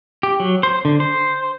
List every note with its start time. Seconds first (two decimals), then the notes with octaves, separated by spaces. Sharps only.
0.23 G4
0.40 F#3
0.63 C5
0.85 D3
1.00 C5